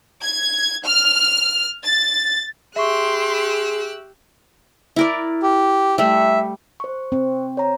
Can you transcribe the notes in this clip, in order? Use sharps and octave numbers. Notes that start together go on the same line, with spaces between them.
G#6
F6
A6
G4 G#4 E5 C6 C#6 E6 F#6
E4 A#4 D5
G4
G3 A3 E5
C5 C#6
C4
C#5 A#5